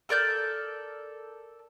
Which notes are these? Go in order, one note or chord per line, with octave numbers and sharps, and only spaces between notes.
A4 A#4 D5 G6